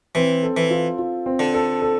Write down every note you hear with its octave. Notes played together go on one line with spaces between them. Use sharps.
E3 C4
A4
E3
F4
F4
C4
D3
A4
A4